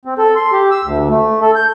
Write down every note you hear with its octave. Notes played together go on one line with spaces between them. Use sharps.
C4
A4
C6
G4
E6
D2
A3
A4
G6